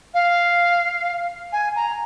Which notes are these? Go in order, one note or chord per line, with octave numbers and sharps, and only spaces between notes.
F5
G#5
A#5